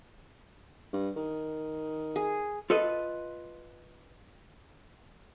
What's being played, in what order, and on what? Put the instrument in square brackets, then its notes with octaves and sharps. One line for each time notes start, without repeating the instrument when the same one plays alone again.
[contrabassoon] G2
D#3
[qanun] G#4
[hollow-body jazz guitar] F4 A4 B4 D#5